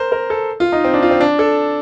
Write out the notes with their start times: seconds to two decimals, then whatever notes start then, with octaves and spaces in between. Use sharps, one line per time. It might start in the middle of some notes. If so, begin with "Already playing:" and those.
Already playing: A#4 C5
0.12 A#4
0.30 A4
0.60 F4
0.72 D#4
0.84 C4
0.94 D4
1.03 F4
1.11 C4
1.21 D4
1.39 A4